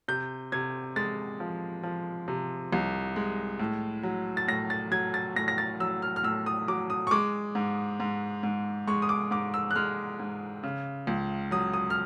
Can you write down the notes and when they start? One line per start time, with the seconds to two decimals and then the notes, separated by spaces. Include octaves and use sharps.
0.08 C3 G6
0.52 C3 G#6
0.96 G#3 A6
1.40 F3
1.83 F3
2.28 C3
2.73 C2
3.16 G#3
3.59 A2
4.03 F#3
4.37 A6
4.48 A2 A#6
4.70 A6
4.91 F#3 G#6
5.14 A6
5.36 A2 A#6
5.48 A#6
5.58 A6
5.80 F#3 E6
6.02 F6
6.16 F6
6.23 A2 E6
6.46 D#6
6.68 F#3 D6
6.90 D#6
7.07 C#6
7.11 G#3 D6
7.55 G#2
8.00 G#2
8.43 G#2
8.87 G#3 C#6
9.02 D#6
9.09 D6
9.31 G#2 D6
9.54 E6
9.71 F#6
9.76 G#3 F6
10.19 G#2
10.63 C#3
11.07 C#2
11.51 F#3 D#6
11.73 D#6
11.90 F6